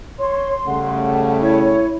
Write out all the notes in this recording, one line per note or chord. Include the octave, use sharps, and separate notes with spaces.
C#5 C6
C#3 G3 A3 F#5
E4 C#5